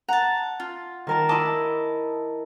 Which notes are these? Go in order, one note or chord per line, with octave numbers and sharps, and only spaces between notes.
F#5 A5 A#5
F4
D#3 A#4 A5
E4 D#5 A5 C6 D6